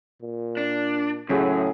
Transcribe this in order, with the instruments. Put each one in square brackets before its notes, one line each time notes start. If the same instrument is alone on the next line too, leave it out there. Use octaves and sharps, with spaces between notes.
[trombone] A#2
[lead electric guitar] D4
[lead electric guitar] F#2 [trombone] A2 [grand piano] C#3 F#3 G#4